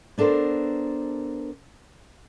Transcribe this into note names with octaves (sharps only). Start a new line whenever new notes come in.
B3 D4 A4 A#4 C5